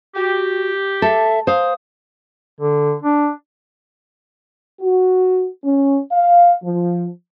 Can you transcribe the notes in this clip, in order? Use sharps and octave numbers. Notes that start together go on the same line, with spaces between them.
F#4 G4
A4 E5
C5 F5 D#6
D3
D4
F#4
C#4
F5
F3